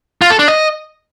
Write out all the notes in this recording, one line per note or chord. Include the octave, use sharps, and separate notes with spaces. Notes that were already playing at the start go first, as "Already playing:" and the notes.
F4
A4
D4
D#5